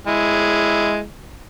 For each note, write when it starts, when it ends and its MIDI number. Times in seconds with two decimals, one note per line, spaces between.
0.07 1.03 56
0.07 1.03 64